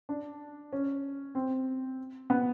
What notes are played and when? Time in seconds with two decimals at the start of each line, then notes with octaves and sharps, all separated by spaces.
0.09 D4
0.73 C#4
1.35 C4
2.30 B3